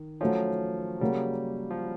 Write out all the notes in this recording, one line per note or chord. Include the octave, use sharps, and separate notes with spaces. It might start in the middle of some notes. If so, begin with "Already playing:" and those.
Already playing: D#3
F3 F#3 A3 C#4
C#3 F#3 G3 A#3
F3